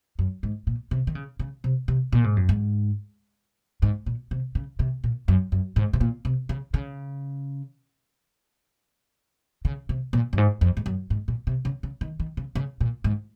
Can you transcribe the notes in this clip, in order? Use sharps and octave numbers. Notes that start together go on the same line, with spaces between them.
F#2
G#2
A#2
C3
D#3
C#3
C#3
C3
C3
A#2
G#2
F#2
G#2
G#2
A#2
C3
C#3
C3
A#2
F#2
F#2
G#2
C3
A#2
C3
C#3
C#3
C#3
C3
A#2
F#2
G#2
F2
G#2
F#2
G#2
A#2
C3
C#3
C#3
D#3
D#3
C#3
C#3
A#2
G#2